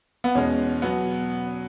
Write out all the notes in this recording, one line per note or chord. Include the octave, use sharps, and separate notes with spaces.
B3
E2 B2 G#3 C#4
B2 F#3 B3